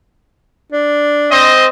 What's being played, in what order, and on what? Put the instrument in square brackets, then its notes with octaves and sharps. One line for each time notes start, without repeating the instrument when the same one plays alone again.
[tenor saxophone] D4
[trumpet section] C4 C5 D#5